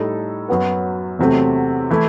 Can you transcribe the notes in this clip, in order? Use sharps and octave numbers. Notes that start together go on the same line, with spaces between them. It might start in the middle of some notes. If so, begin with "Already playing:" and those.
Already playing: A2 G3 D#4 A4
F#2 F#3 B3 F#4 B4
E2 C3 F#3 A3 C4
E3 A3 E4